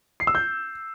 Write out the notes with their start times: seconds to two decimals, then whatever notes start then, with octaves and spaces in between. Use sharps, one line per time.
0.20 C7
0.27 E6
0.35 G6